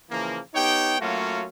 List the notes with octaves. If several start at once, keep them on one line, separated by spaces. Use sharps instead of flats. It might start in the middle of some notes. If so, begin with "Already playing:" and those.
C#3 E3 F3 A#3
B3 D#4 G4 C#5 G5
F#3 A3 A#3 C#4 F4 F#4